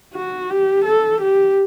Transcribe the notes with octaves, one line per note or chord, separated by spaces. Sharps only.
F#4
G4
A4
G4